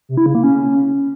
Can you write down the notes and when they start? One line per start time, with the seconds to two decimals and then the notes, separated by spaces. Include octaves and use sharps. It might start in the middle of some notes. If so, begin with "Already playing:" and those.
0.09 C3
0.17 E4
0.26 C#3
0.35 A#3
0.43 C#4